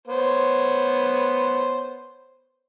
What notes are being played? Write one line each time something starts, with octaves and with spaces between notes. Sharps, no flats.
B3 C5 C#5